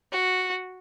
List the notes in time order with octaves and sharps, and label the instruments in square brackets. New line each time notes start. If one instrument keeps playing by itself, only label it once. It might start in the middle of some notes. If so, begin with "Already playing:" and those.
[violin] F#4